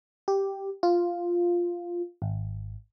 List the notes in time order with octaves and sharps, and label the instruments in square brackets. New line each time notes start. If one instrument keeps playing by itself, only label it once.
[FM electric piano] G4
F4
G#1